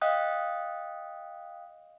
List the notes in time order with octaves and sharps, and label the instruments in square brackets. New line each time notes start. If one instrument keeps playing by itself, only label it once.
[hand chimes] D#5 F5 G5 D#6 F#6